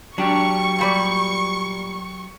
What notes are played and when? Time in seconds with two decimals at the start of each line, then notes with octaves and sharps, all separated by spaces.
0.18 F#3 D4 G4 C#6
0.79 A#2 G3 D5